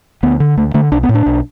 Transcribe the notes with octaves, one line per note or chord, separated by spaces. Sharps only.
D2 B3
D3
D2 A3
D3 A3
B1 D4
B3
A2
D4
B1